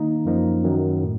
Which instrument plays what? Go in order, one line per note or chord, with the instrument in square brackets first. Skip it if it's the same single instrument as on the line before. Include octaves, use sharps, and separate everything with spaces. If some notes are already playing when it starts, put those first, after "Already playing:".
Already playing: [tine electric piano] D#3 A#3 D#4
F#2 F3 A#3 D#4
F#2 D#3 F#3
A2